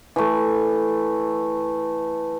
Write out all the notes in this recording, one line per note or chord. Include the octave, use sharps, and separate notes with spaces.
E3 A3